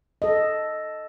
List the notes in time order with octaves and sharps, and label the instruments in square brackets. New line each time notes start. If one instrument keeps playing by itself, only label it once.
[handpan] A4 D#5